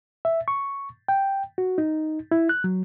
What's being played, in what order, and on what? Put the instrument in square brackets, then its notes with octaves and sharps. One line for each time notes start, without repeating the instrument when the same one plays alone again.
[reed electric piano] E5
C#6
G5
F#4
D#4
E4
F#6
F#3